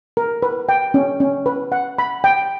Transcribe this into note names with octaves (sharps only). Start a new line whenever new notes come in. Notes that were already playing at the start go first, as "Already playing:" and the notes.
A#4
B4
G5
C#4
C#4
B4
F#5
B5
G5